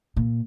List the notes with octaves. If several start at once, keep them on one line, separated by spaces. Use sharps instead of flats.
A#2